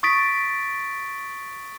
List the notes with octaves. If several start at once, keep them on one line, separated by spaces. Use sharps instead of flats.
C#6 D#6 A6 B6 D7